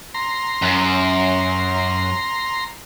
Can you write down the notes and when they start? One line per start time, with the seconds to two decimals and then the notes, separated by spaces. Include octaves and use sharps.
0.14 A#5 C6
0.62 F#2